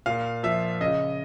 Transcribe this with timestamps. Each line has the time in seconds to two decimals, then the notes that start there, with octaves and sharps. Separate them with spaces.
0.06 A#2 F5
0.43 F3 E5
0.81 C#3 D#5